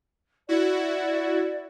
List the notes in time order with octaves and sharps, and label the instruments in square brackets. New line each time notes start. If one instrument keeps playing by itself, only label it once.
[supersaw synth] E4 F#4 [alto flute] D5